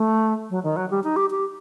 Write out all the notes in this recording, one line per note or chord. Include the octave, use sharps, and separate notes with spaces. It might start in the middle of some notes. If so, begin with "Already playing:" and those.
Already playing: A3
F#3
D#3
F#3
G3
D#4
G4
G4